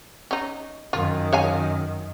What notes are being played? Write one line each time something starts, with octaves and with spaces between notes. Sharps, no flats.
C#4 D#4
F#2 D#3 F4
C#5 F5 G#5